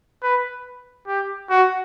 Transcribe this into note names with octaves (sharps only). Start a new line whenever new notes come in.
B4
G4
F#4